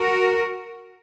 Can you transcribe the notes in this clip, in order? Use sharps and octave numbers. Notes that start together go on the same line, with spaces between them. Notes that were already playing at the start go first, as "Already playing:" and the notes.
Already playing: F#4 A#4